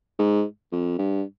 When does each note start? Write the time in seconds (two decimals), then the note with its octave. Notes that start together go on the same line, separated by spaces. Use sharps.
0.19 G#2
0.72 F2
0.98 G2